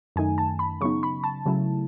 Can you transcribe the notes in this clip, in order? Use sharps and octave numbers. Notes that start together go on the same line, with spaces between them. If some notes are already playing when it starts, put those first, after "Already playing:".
F#2 D#3 A3 D#4 G#5
A5
B5
C#3 F#3 B3 D#4 C#6
B5
A5
C#3 F#3 A3 E4